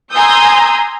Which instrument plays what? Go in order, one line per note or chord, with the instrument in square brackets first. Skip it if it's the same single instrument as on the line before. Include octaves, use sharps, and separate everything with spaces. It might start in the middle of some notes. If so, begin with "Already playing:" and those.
[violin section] G#5 A#5 C6 D#6 E6 G6